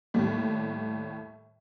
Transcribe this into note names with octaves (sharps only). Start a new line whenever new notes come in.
D#2 A2 G3